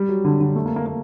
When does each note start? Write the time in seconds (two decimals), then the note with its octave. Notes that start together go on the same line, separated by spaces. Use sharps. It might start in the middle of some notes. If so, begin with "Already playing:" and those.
Already playing: G3
0.09 F#3
0.25 D3
0.41 D3
0.56 A3
0.66 A#3
0.76 A#3
0.86 A#3